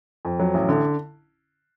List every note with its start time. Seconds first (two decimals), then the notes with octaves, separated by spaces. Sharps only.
0.25 F2
0.40 F#3
0.54 A1
0.69 D3